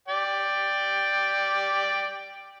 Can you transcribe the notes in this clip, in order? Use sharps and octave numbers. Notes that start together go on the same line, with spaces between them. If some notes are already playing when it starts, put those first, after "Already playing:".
D5 G5